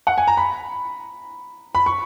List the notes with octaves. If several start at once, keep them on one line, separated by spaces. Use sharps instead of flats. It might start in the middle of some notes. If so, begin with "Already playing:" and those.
F#5
G#5
A#5
B5
B5
C#6